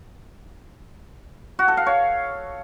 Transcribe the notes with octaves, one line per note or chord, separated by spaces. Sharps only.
F#4
A4
F5
C#5